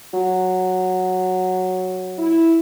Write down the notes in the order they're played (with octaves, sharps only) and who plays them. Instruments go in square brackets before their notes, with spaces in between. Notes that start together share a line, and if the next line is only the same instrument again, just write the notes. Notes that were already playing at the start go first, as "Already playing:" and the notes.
[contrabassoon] F#3
[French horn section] E4